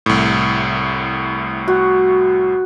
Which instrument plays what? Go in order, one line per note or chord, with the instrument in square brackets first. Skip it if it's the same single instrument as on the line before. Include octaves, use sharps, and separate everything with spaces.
[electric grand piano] C2 A2
[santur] F#4